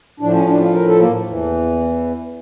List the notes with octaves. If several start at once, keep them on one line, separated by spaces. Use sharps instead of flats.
A2 F3 D4
C#4
D4
F4
A#4
A4
A#3
E2 E3